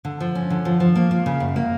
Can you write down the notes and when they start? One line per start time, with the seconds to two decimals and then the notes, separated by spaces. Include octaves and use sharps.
0.05 D3
0.20 F3
0.35 C#4
0.50 D3
0.65 F3
0.80 F3
0.95 A#3
1.11 A#3
1.26 C#3
1.40 F#2
1.56 A#3